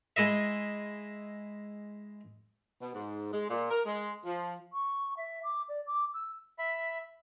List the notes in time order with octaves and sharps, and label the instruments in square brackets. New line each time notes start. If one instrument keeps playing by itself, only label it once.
[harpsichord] G#3 E4 D#5 E5
[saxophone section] B2
G#2
G#3
A#2
A#4
G#3
F3
[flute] C#6
E5
D6
D5
D6
E6
[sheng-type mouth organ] E5 B5